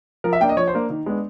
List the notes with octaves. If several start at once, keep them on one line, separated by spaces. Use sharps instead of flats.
F3 A#4
E5
A#3 D4 G5
D#5
F3 C#5
C5
A#3 D4
D#3
G#3 B3 D4